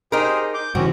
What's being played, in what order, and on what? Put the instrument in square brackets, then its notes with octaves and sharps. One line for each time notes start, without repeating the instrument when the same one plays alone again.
[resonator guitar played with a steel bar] D#4 A#4 [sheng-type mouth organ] G4 G#4 C5
[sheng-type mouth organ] D6 G6
[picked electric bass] G2 C#3 E3 [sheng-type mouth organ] C4 C#4 [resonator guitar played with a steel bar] F#4